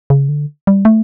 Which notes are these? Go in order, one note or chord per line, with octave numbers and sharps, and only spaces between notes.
C#3
D3
G3
A3